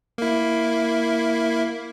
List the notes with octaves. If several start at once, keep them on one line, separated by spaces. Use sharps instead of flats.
A#3 E4